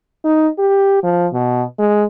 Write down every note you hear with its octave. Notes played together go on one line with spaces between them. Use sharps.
D#4
G4
F3
B2
G#3